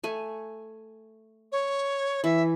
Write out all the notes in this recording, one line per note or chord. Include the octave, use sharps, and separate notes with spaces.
A3 G#5
C#5
E3 E5